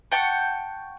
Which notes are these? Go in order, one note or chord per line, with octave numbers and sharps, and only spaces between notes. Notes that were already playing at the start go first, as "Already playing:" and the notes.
F#5 G5 A5 C#6